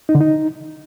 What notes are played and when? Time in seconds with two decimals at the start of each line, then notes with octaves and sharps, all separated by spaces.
0.09 D#4
0.15 D3
0.21 D#4